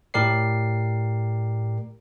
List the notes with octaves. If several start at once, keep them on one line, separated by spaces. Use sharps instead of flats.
A2 G4 A#4 D5 C7